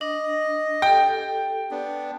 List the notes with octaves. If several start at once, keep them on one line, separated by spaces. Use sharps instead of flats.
D4 D#5
G4 A4 G5
B3 D4